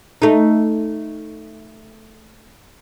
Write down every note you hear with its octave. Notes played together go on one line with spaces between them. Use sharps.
A3 D#4